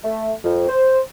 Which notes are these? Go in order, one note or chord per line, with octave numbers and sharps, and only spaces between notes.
A3
F2
C5